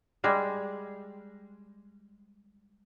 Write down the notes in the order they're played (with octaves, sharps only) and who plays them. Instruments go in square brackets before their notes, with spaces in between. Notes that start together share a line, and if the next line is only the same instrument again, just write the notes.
[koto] G3 G#3